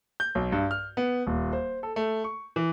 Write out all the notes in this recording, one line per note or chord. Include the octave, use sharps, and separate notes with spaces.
G6
B1
G2
F6
B3
D#1
C5
A4
A3
C#6
E3